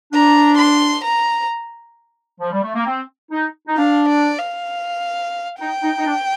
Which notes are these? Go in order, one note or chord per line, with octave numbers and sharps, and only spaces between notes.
D4 A#5
C6
A#5
F3
G3
A3
A#3
C4
D#4
D#4
D4 F5
D5
F5
D#4 G5
D#4
D#4
D4